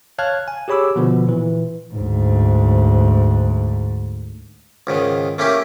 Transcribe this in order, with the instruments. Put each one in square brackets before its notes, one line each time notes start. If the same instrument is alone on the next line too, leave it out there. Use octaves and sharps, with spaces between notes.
[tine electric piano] C#5 F5 A5 F6 F#6 G#6
G#5
G4 G#4 C#5 B5 D6 E6
B2 D3 F3 B3
A#2 E3
[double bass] D2 G#2
[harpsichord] C#2 G#2 D#3
A3 A#3 C#4 E4 G4